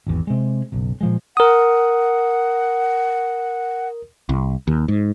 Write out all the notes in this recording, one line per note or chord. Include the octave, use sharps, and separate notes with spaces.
G#1 E2
C3 G#3
F#1 B1
A#2 F3 G#3
A#4 F#5 D#6
C2
D#2
G#2